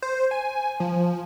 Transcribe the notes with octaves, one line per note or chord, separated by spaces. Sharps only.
C5
G#5
F3